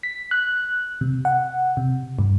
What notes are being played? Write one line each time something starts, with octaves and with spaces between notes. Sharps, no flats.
B6
F#6
C3
F#5
C3
G2